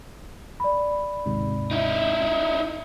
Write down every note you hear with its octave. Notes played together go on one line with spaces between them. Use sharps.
D5 B5
D#2 G#2 C3
D#4 E4